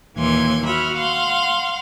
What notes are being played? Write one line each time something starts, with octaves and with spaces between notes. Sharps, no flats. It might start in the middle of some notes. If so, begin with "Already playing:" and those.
D#2 A#2 E3 C6 G#6
F#4 E5 B5 F6
F5 F#5 C6